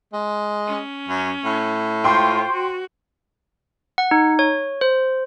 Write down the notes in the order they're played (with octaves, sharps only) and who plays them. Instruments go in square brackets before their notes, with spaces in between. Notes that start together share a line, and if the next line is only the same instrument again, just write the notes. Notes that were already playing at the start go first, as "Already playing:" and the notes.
[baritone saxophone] G#3
[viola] C#4
[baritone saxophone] F#2
A2
[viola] F4 C5 [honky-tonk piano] G5 C6 C#6
[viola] F#4
[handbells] F#5
D#4
C#5
C5